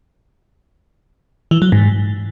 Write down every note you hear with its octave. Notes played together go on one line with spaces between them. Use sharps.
E3
F#3
G#2